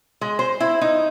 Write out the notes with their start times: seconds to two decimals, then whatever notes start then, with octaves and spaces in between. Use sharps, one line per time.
0.21 G#3
0.39 C5
0.60 E4
0.81 D#4